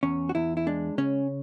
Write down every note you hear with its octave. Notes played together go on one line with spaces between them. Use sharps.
E2 C#4
F#4
E2 E4
E4
G#3 D4
C#3 C#4